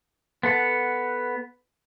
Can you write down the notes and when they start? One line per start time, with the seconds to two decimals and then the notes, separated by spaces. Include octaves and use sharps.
0.43 B3 A4 F#5